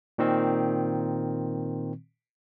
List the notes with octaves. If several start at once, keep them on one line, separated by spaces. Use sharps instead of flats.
A#2 D#3 C4